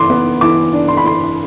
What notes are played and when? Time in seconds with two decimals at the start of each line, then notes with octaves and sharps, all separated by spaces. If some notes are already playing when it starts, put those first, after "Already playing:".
Already playing: E3 C6 D6
0.10 B3
0.41 E3 D6
0.73 D4
0.88 C6
0.97 B5
1.04 E3 C6